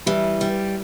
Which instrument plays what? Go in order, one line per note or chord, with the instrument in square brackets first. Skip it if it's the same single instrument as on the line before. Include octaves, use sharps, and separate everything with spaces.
[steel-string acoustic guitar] E3 [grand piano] G3
[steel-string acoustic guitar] G3